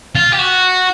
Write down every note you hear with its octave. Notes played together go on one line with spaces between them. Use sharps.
F4
G4
F#4